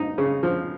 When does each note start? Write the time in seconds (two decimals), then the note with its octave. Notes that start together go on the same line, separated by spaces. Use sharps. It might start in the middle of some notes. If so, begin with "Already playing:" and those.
Already playing: D#4
0.18 C#3
0.43 F3